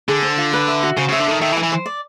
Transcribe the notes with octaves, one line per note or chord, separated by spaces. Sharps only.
D3 G#4
C5
F4
B4
E5
F#4
C#3 C5
C#3 E5
D3
D#3 A4
D#3 E5
E3
G#5
E3
C5
D5